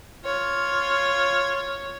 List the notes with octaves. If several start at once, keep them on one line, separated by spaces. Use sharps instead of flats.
F4 C#5